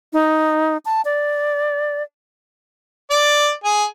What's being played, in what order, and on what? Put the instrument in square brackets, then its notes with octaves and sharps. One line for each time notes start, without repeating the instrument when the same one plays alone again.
[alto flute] D#4
A5
D5
[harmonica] D5
G#4